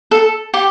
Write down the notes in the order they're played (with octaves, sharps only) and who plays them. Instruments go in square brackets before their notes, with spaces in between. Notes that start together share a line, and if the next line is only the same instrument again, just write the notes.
[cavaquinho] A4
G4